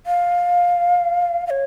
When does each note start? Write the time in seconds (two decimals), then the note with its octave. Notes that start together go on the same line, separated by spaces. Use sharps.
0.06 F5
1.47 F5
1.50 C#5